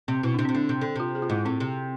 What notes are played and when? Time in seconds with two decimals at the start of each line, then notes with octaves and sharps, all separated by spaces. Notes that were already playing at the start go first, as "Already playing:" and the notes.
0.08 C3 C4
0.23 B2 E4
0.34 C3 D4
0.45 C3 C4
0.55 D3 D4
0.69 C3
0.81 D3
0.96 C3 F4
1.15 G#4
1.22 F4
1.30 G#2 E4
1.45 A2 C4
1.60 C3